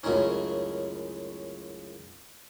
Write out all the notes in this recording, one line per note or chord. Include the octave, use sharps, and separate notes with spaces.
C#2 F#2 A2 D#3 C#4